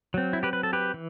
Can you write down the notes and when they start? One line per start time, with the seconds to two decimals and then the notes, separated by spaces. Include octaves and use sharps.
0.14 F#3 C4
0.33 E4
0.43 G4 B4
0.53 B4
0.63 A4
0.73 G4 B4
0.94 E3